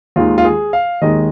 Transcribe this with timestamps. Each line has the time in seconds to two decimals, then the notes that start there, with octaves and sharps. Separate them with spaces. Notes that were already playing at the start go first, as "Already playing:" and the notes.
0.16 D#2 D#3 G#3 F4
0.38 F4
0.45 G#4
0.73 F5
1.02 D#2 D#3 G#3 D#5